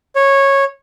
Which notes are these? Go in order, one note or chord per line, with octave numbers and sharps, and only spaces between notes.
C#5